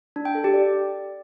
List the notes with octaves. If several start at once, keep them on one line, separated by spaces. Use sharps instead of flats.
D4
G5
A4
G4
D5